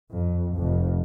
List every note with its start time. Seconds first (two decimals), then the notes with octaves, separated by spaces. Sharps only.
0.11 F2
0.56 F1 F2